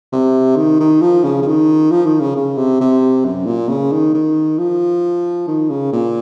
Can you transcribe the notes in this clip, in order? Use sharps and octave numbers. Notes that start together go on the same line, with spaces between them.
C3
D#3
D#3
F3
C#3
C#3
D#3
F3
D#3
C#3
C#3
C3
C3
F#2
A#2
C#3
D#3
D#3
F3
D#3
C#3
A#2